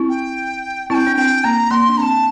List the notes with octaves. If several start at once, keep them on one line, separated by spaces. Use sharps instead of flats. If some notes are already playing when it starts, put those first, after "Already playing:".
Already playing: C4 E4
G5
C4 E4 G5 A5
D4
C4 G5
A#3 A#5
A#3 C6
D4
C4 A5 A#5